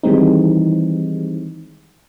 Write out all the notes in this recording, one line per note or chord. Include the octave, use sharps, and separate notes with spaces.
D#3 E3 G3 G#3 C4 D#4